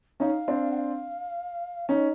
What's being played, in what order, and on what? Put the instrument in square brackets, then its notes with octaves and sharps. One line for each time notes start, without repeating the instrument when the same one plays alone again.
[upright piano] C#4 D#4 [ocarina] F5
[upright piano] C4 D4
[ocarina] F#5
F5
[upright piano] C#4 D#4 [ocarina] D#5